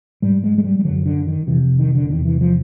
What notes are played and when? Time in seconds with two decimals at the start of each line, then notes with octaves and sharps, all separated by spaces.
0.22 G#2 G3
0.44 G#3
0.58 G#3
0.64 G3
0.79 G3
0.85 F#2 D3 F#3
1.06 D3
1.27 D#3
1.47 F2 C3 E3
1.79 D#3
1.95 D3
2.10 E2 C3 D#3
2.25 E3
2.41 F3